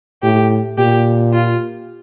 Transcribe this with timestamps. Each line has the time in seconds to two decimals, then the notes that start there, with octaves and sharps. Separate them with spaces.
0.23 A2 G4
0.78 A#2 G4
1.33 F4